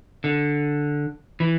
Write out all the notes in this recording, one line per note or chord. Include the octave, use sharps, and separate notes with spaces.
D3
E3